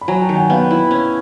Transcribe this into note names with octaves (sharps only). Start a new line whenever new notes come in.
B5
F#3 G#5 A#5
G5 A5
D#3
F#5 G#5
B3 F5 G5
E4
C#4